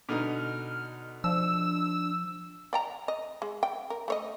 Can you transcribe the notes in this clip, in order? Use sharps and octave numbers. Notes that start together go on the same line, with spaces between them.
B2 D3 D#4 F6
F3 D4 E6
D5 G5 A#5
D#5
G#3
G5
A#4
A3 C#5 D#5